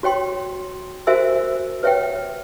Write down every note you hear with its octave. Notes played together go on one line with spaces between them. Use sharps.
F#4 C#5 G5 C6
F#4 A#4 C5 E5 G#5 E6
B4 C#5 E5 F#5 G5